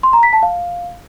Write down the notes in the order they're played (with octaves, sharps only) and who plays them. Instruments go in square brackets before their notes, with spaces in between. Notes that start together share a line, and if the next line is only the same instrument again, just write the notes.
[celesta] C6
A#5
B6
A5
F5